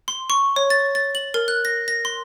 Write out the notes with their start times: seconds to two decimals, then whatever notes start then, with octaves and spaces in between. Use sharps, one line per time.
0.08 C6
0.30 C#6
0.56 C#5
0.70 A6
0.95 A6
1.15 F#7
1.34 A#4
1.48 F#6
1.65 A#6
1.88 A#6
2.05 C6